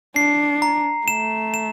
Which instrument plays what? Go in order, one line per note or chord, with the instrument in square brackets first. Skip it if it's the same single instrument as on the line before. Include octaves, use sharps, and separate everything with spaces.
[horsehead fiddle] D4 [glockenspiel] C7
[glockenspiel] A#5
[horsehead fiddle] A3 [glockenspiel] E7
[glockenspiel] E7